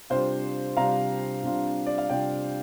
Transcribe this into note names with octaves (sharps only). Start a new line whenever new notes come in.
C3 G3 D4 F4 C5 F5
C3 G3 D4 F4 F5 A#5
C3 G3 D4 F4
D5
F5
C3 G3 D4 F4 D5 G5